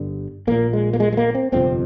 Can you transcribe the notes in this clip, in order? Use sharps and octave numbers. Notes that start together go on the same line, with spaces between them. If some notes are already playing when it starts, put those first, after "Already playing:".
Already playing: G1 G2 D3
A#1 A#2 A#3
G#3
A#3
G#3
G#3
A#3
C4
G1 F2 C3 C4